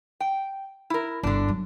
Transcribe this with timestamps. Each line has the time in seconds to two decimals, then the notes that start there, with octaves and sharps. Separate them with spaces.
0.20 G5
0.90 E4 A#4
1.23 G1 D3 D4
1.48 F#3